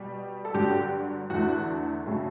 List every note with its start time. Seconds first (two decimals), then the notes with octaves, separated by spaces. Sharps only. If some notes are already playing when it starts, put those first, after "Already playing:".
Already playing: B2 G3
0.45 A4
0.54 G2 D3 F#3 G4
1.30 E2 D3 A3 F#4
2.06 C#3 F#3 A3